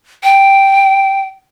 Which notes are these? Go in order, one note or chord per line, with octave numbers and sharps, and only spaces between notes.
G5